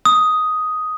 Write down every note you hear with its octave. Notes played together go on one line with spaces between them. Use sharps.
D#6